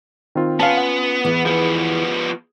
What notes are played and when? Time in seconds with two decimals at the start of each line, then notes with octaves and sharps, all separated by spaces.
0.35 D#3 C4 F4
0.60 B3 C#4 F4 F5 G#5 A5
0.78 F#5
1.25 E2 E3
1.46 F3 B3 G#4